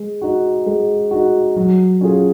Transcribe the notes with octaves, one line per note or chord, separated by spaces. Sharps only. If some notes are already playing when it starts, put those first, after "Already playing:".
Already playing: G#3
D#4 F#4
G#3
D#4 F#4
F#3
C#4 F4 G#4